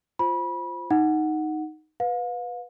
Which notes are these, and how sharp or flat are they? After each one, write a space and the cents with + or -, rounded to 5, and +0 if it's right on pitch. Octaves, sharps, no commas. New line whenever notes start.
F4 +0 C5 +5 B5 -25
D#4 +0 F#5 +0
B4 +0 F5 +35